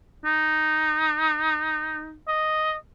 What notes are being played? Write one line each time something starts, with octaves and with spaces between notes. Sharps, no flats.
D#4
D#5